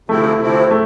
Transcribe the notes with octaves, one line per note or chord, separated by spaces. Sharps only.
D2 C3 F3 A3 C4 E4
D2 C3 F3 C4 E4
A3